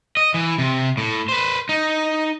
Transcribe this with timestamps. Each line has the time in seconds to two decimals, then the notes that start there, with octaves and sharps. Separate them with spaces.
0.17 D#5
0.34 E3
0.58 C3
0.97 A2
1.28 B4 C5
1.69 D#4